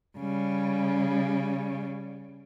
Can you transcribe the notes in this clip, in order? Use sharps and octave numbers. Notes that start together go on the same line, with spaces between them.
C#3 G3